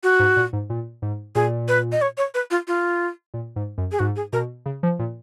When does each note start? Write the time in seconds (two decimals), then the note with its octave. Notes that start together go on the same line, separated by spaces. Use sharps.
0.03 F#4
0.19 G#2
0.36 A#2
0.53 G#2
0.70 A#2
1.02 G#2
1.35 A#2 G#4
1.68 B4
1.92 D#5
2.02 C#5
2.18 C#5
2.34 B4
2.51 F4
2.68 F4
3.34 A#2
3.56 G#2
3.78 F#2
3.92 G#4
3.99 G#2 F#4
4.16 G#4
4.33 B2 A#4
4.66 C#3
4.83 F3
4.99 A#2